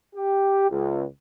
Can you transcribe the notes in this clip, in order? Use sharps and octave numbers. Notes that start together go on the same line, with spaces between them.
G4
C#2